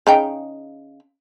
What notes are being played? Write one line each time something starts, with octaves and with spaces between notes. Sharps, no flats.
C#3 D#4 G5